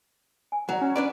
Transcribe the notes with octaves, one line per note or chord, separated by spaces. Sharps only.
G#5
F#3 D5 F#5 A#5
C#4
D4 B4 D5 B5